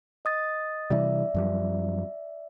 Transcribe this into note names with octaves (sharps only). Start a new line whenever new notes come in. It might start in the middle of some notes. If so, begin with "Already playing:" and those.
D#5 D#6 A6
C3 E3 G3 D5 E5
F#2 F3 G3